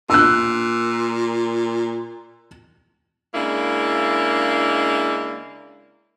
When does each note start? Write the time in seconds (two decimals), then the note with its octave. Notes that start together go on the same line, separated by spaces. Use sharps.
0.10 A#2 E6 F#6
3.35 C#3 G#3 A#3 D4 E4